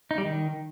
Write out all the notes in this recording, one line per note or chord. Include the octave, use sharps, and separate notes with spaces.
D#4
G3
D#3